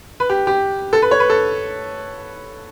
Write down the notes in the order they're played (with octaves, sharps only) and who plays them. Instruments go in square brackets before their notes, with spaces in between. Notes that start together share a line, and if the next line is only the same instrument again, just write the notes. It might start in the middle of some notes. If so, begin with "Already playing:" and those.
[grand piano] B4
G4
G4
A4
B4
C#5
B4
A4